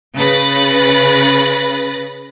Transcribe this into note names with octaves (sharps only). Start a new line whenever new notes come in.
C#3 B4 B5 F#6 A6 A#6